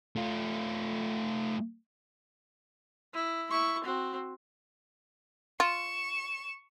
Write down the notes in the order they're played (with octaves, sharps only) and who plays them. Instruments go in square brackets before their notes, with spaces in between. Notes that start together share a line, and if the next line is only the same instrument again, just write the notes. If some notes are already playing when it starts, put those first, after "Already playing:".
[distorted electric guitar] A3 F4
[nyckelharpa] E4
E4 C#6
C4 F#4
[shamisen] F4 [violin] C#6 E7